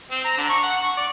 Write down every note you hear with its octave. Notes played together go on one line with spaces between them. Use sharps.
C4
A#5
D3
C#6
F#5
C#6
D5